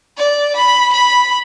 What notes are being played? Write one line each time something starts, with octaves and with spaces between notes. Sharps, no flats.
D5
B5
B5